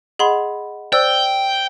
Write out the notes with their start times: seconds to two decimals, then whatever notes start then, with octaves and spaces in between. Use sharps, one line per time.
0.19 G#4 D#5 F#5 B5 C6
0.93 C5 D5 G5 E6